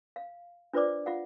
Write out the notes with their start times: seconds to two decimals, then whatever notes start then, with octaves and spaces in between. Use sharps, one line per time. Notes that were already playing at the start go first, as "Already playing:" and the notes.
0.16 F5
0.73 D4 F4 B4 C5 D5 D6
1.06 F4 F5 F#5